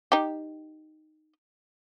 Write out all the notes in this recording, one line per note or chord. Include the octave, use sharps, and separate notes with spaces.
D#4 G4